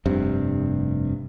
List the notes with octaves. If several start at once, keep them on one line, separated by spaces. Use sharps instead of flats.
F1 G2 C3